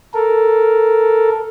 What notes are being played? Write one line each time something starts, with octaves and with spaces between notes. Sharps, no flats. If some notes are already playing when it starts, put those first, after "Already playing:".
A4 A#4